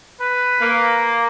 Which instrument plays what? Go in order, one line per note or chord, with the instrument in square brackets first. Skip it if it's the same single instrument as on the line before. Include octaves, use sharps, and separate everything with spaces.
[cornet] B4
[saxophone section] A#3